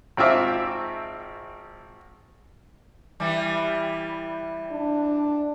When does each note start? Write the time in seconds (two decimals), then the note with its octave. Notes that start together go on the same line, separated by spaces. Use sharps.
0.17 G#1 C4 F4 E5 D6
3.20 E3 G3
4.72 D4